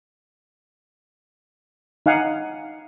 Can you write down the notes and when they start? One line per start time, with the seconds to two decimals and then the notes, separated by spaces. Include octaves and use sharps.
2.06 D#4 F5 F#5 G#5